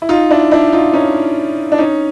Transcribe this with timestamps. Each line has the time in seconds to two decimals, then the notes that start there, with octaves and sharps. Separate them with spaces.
0.02 E4
0.09 D#4 F4
0.31 D4 E4
0.51 D4 E4
0.72 D#4 F4
0.93 C#4 D#4
1.72 D4
1.78 C#4 D#4